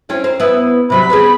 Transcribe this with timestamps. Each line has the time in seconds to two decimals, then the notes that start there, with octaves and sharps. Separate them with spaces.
0.09 C4 C#4 E4
0.24 A#4 C5
0.40 B3 E4
0.90 C3 F#3 G3 B5
1.10 B3 C#4 G#4